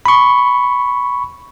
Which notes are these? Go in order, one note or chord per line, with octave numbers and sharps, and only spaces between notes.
B5 C#6